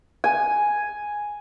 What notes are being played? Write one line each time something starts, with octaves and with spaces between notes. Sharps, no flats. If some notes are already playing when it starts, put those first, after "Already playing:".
G#5